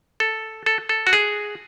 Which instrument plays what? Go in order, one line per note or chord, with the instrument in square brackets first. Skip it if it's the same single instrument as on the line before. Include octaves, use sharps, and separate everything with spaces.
[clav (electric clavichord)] A4
A4
A4
F#4
G#4